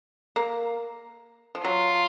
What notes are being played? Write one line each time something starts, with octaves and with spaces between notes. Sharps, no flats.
A#3
F3
F#3 F4